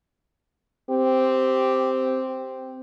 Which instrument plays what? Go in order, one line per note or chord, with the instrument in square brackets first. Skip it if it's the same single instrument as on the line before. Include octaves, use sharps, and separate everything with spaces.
[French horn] C4 [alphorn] G4